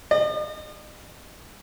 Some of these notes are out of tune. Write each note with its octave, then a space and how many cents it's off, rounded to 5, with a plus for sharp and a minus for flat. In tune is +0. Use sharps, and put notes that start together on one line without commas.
D#5 -45